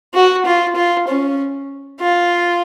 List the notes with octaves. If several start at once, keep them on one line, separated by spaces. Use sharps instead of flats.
F#4
F4
F4
C#4
F4